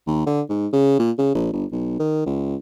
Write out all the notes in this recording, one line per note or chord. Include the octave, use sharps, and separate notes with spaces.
D#2
D3
G#2
C#3
A#2
C#3
A#1
G1
B1
D#3
C#2